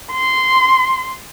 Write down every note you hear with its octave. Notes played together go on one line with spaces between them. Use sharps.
C6